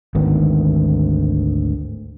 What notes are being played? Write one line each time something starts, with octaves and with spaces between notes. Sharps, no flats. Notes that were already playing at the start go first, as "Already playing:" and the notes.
G#1 D2 D#3 B3